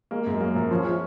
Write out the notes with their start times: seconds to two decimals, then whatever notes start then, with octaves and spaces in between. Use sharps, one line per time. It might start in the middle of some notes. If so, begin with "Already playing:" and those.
0.11 G#3 A#3
0.26 F#2 G#3
0.41 F#3 A#3
0.55 F#2 F3
0.71 F3 C#4
0.85 F3 G#4